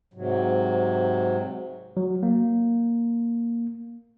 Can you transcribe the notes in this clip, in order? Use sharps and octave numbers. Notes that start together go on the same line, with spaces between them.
G#2 C3 F#3
F#3
A#3